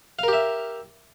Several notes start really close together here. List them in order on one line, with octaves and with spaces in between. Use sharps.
F5 A#4 G4 E5